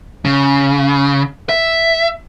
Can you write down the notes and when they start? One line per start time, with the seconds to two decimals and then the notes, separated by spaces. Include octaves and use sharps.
0.25 C#3
1.49 E5